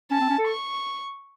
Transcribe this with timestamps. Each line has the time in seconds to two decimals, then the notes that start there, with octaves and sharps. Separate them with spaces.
0.11 C#4 A5
0.20 C4
0.30 C#4
0.38 A4
0.48 C#6